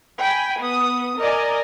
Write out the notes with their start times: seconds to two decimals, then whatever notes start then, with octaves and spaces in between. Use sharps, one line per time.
0.19 G5 G#5 B5
0.59 B3 D#6
1.18 A#4 D5 D#5 G#5 A#5